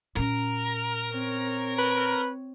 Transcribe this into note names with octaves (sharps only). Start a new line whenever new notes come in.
A#2 C#4 A#4
C4 C#5
B4